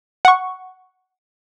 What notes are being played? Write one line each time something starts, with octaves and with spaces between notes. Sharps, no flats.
F#5 C#6